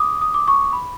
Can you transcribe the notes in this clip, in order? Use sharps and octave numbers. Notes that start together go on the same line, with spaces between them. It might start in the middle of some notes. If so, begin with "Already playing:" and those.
Already playing: D6 D#6
D#6
D6
C#6
B5